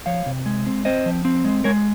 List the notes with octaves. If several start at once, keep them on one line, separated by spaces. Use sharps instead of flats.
F3 C#5 F5
C3
G#3
C4
C4 C5 D#5
F3
C4
G#3
G#3 A#4 C#5